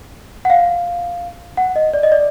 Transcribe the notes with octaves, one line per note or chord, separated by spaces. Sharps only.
F#5
F5
F#5
D#5
D5
D#5
D5